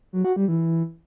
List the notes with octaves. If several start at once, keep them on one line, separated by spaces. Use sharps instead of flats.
F#3
F#4
G3
E3